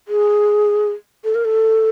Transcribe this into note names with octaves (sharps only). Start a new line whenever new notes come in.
G#4
A4
A#4
A4